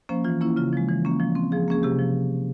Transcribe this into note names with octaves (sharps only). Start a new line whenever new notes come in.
F3 A#3 C#4 C5
E3 F4
A#3 C#4 E4
C#3 F4
F3 G#3
E3
A#3 C#4
F3
C4
F3 G#4
A#3 C#4 G#4
C3 G4
F3